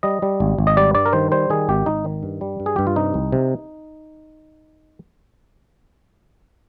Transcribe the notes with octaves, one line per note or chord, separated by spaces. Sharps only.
G3 D#5
G3
G#1
G#1
D#5
G3 D5
G2 D5
A#4
D#3 C5
G3 C5
D#3 G#4
G#1 G4
G#1 D#4
D#3
G2
G3
G2
G#4
G2 G4
F4
C3 D#4
C2
C3